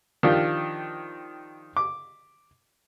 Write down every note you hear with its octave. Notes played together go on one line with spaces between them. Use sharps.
D#3 F3 D4 F4 G4
D6